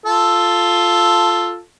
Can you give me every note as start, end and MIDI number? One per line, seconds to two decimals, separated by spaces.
0.06 1.59 65
0.06 1.59 69